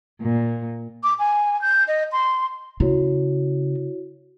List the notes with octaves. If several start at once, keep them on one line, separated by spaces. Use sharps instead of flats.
A#2
D6
G#5
G6
D#5
C6
C#3 E4 F#4 C#5